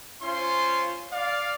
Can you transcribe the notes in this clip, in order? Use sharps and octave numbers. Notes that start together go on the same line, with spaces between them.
C#4 F4 C5 C6
D5 F5